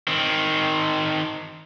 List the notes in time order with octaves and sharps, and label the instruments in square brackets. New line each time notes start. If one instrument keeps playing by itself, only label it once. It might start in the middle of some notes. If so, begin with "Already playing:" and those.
[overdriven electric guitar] D#3 C4